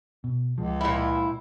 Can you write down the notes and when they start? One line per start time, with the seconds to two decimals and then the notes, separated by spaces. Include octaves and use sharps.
0.24 B2
0.58 C#2 F3 G#3
0.81 A#2 E4